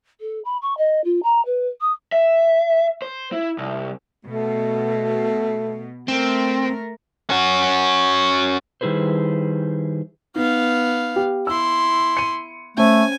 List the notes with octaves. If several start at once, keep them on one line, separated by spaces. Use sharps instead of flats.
A4
B5
C#6
D#5
F4
A#5
B4
D#6
E5
C5
E4
C2
B2 A3
A3 C4 A#4
C#4 F#4
D#3 G3 E4 G#4 B4 C5
B3 D#4 F5
G4
E4 C6 E6
C#7 D#7
A3 C#4 C5 G#5